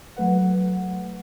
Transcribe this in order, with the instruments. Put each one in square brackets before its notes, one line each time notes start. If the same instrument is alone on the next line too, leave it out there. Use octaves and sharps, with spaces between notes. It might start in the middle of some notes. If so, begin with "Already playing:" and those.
[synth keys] F#3 A3 B4 F#5